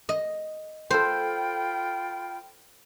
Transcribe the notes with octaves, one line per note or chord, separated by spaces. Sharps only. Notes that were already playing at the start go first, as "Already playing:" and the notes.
D#5
F4 A4 C5 G5 B5